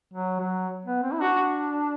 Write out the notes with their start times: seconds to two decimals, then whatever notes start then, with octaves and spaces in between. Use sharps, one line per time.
0.14 F#3
0.40 F#3
0.85 B3
1.03 C4
1.13 E4
1.21 D4 F#4